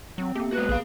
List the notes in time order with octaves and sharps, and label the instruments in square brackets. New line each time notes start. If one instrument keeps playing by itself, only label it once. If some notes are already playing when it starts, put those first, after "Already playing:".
[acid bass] F#3 [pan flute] C4
[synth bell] A#3 B3 [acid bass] G4
[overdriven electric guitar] G#3 F#4 [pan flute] B4
[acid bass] A#1 [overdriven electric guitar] G#4 F5